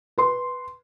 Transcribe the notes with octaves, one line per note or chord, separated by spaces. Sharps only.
B4 C6